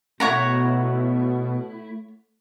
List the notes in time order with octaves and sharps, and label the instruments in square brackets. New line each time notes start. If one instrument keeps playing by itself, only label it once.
[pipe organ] B2 [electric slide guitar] A3 E4 [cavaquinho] C#5 F#5 A#5